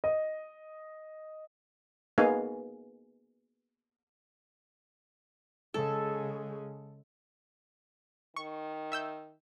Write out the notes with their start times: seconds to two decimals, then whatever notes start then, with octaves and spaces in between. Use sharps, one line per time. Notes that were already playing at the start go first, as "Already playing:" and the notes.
0.04 D#5
2.18 A#3 B3 D#4 G#4 F5 G#5
5.74 C#3 G#3 A4
8.36 D#3 C#6
8.92 E5 E6 G6